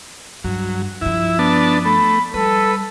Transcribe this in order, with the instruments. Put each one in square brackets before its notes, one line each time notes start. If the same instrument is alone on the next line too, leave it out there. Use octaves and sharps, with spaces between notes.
[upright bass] G2 [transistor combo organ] F#3
[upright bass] G2 F3 [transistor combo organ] E4
[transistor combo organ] B3 D4 A5
[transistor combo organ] A3 [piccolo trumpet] B5
[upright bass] G3 [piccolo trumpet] A4 [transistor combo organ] B4